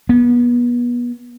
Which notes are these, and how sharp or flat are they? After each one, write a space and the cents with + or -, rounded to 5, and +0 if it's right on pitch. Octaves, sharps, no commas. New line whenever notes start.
B3 -30